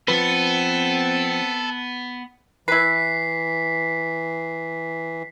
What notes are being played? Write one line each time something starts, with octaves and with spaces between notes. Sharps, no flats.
F3 B3 C4 A4 B4
E3 E4 B4 B6 C7